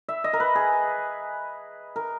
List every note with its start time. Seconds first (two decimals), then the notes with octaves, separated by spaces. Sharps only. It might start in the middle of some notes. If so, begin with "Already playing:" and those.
0.09 E5
0.24 D#5
0.33 A#4
0.40 B4
0.55 G#4
1.96 A#4